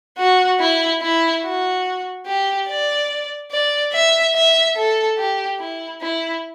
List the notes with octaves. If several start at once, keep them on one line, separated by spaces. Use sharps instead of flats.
F#4
E4
E4
F#4
G4
D5
D5
E5
E5
A4
G4
E4
E4